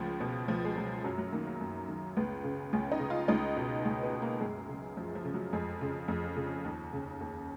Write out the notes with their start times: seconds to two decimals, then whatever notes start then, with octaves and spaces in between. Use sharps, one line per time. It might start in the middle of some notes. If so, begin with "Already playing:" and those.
Already playing: C#2 F3
0.20 B2
0.48 C#2 F3
0.64 G#3
0.77 B2 F#3
1.04 F#2 F#3
1.18 F#3
1.32 D#3 A#3
1.47 A#3
1.61 F#2
1.88 D#3
2.17 C#2 B3
2.44 C#3
2.73 C#2 C#4
2.92 D#4
3.00 C#3
3.10 F4
3.28 C#2 D#4
3.57 B2
3.84 C#2 C#4
4.03 B3
4.13 B2
4.22 A#3
4.41 F#2 G#3
4.69 C#3
4.97 F#2 F3
5.15 F3
5.25 C#3
5.34 F#3
5.53 F2 G#3
5.81 C#3
6.08 F2
6.36 C#3
6.46 C#4
6.65 D#2
6.93 C#3
7.21 D#2